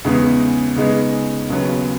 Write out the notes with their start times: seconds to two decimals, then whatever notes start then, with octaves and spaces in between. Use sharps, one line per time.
0.04 E2 C#3 G#3 B3 D#4
0.76 C#3 G#3 B3 D#4
1.49 D#2 C#3 F#3 B3